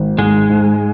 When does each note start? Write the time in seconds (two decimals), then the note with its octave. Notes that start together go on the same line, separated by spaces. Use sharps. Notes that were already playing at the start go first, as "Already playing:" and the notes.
Already playing: G#1
0.18 G#2 G#3
0.49 G#2